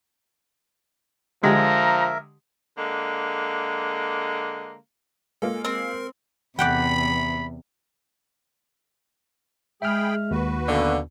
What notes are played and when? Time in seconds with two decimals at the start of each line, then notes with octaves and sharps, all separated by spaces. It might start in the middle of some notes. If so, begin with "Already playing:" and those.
1.43 D3 F3 G#3 G4 A#4 E5 A#5
2.77 D3 G#3 A#3
5.42 G#3 A#3 F4 A4
5.65 C4 A#4
6.59 E2 C3 D5 F#5 G5 B5
9.82 G#3 G#4 E5 G5 B5 F6
10.31 D#2 F#4 B4
10.68 F#2 B2 D3 F5